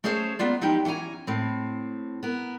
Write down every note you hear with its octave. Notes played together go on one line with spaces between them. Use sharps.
A3 C#4 G#4 A4 C5 C#5
A#3 B3 F4 D5
F3 D#4 E4 G4 G5
E3 C#4 G5 G#5 A#5
A2 C4
B3 A#4